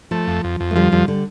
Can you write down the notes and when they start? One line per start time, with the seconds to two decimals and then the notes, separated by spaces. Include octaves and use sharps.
0.11 F3 A3
0.27 F2
0.44 F2
0.60 F2
0.71 A3
0.75 D3 F3 G3
0.92 F2 D3 G3
1.08 D3 G3